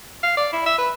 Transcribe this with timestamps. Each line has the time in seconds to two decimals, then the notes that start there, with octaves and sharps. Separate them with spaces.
0.23 F5
0.37 D5
0.53 E4
0.66 E5
0.78 B4